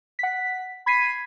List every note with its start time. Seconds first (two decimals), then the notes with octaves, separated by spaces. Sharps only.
0.19 F#5 B6
0.86 B5 G#6 B6 C7 D#7